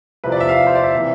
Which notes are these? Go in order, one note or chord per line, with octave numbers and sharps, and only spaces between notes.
C2 C3 F3 B4
D5
E5
F5
C5
D5
E5
C3 E3